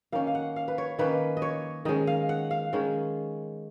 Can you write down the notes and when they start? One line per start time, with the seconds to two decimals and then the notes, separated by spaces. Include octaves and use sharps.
0.12 D#3 A#3 C#4 F5
0.27 F5
0.35 F#5
0.56 F5
0.68 B4
0.78 C#5
0.99 D#3 A#3 C#4 B4
1.37 D#5
1.42 C#5
1.85 D#3 G#3 C#4 D#5
2.07 F5
2.29 F#5
2.51 F5
2.73 D#3 G#3 C#4